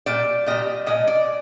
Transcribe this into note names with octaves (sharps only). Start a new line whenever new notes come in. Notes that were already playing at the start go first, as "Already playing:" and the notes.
A#2 G3 D5
A#2 G3 D#5
A#2 G#3 D#5
D5